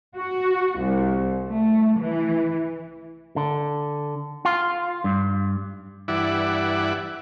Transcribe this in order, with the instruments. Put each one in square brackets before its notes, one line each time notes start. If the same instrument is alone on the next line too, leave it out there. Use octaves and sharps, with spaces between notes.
[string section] F#4
C2
A3
E3
[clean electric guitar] D3
F4
G2
[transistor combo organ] G2 E3 E4 D5 F#5